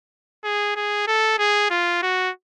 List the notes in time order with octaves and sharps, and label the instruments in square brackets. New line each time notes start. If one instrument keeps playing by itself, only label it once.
[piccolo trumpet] G#4
G#4
A4
G#4
F4
F#4